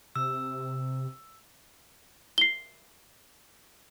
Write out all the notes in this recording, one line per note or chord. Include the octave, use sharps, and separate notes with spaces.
C3 E6
C7 G7